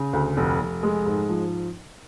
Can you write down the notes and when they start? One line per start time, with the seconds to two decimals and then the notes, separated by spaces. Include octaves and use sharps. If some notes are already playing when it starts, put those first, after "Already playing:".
Already playing: C#3
0.13 D2
0.37 F1
0.60 F1
0.83 G#3
1.06 G#2
1.29 F3